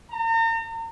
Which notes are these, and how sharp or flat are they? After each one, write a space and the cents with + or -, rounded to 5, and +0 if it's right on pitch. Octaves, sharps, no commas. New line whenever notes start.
A#5 -40